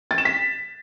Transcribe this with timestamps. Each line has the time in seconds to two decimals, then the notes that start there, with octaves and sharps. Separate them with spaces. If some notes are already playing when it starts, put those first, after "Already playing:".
0.11 A6
0.18 E7
0.25 B6